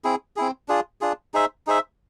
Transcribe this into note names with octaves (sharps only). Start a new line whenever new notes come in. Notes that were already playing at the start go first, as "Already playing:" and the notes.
C4 E4 G#4
C4 E4 G#4
D4 F4 G#4
D4 F4 G#4
D#4 G#4 C5 E5
D#4 G#4 C5 E5